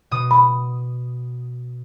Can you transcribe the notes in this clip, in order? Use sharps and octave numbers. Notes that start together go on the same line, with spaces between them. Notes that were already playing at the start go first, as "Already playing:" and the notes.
B2 D#6
B5